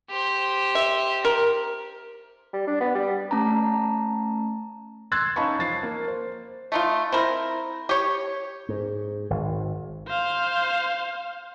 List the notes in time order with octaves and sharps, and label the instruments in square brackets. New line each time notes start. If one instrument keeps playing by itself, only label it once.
[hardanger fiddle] G4 C5
[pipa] E5
A#4
[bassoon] G3
D4
B3
G3
[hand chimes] A3 C#4 A5 A#5
[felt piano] C6 E6 F#6 G#6 A6
C#4 D#4 F5 A5 B5 C#6
F3 A6 C7
A#3
C5
[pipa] A3 D#4 F4
C4 E4 A#4
G4 C#5
[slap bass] G#2
G#1
[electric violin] C5 F5